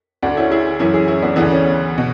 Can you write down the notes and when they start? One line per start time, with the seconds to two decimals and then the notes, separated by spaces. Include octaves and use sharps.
0.22 D2 D3 D4 F#4
0.37 C#4 E4
0.51 E4 G#4
0.79 F#2 E3 C#4 E4
0.94 E4 G#4
1.08 C#4 E4
1.22 B3 D4
1.36 D2 C#3 E3 B3 D4
1.51 C#4
1.98 B2